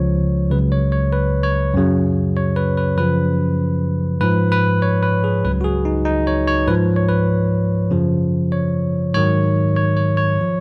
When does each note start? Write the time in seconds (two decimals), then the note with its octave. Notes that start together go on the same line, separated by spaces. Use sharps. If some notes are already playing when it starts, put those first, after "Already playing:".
Already playing: C#2 C#3 F3 C#5
0.51 C#2 C#3 F#3 B4
0.72 C#5
0.92 C#5
1.13 B4
1.43 C#5
1.74 F#2 C#3 F#3
2.37 C#5
2.56 B4
2.77 B4
2.97 F#2 C#3 F3 B4
4.21 G#2 F3 B4
4.52 B4
4.82 C#5
5.03 B4
5.24 G#4
5.44 C#2 C#3 F#3 B4
5.61 F#4
5.64 G#4
5.85 D#4
6.05 D#4
6.27 C#5
6.48 C#5
6.68 G#2 F3 B4
6.96 C#5
7.09 B4
7.91 F#2 C#3 F3
8.52 C#5
9.14 G#2 D#3 F#3 C#5
9.76 C#5
9.97 C#5
10.17 C#5
10.41 F3